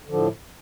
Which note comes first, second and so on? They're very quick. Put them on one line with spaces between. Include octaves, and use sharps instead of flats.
D3 F3 A2